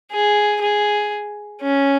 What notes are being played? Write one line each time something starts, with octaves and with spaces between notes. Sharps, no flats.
G#4
G#4
C#4